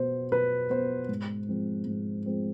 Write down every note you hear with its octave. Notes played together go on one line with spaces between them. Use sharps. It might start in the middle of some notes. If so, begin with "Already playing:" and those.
Already playing: B2 B3 C5
B2 B4
B3 C5
G#2
F3 G#3 C4
G#2
F3 G#3 C4